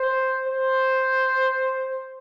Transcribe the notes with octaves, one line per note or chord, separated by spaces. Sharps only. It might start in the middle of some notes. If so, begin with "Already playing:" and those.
Already playing: C5
C5